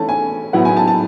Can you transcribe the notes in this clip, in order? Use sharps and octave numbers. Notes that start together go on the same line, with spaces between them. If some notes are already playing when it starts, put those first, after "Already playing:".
Already playing: E3 A3 C#4 A5
G#5
A2 F#3 B3 E4 F#5
G#5
A5
A5